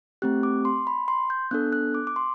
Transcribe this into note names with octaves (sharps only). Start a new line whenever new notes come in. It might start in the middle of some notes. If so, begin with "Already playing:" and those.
A3 C4 G4 F#6
D6
C6
B5
C6
G6
B3 D4 A4 F#6
F#6
D6
D6
C6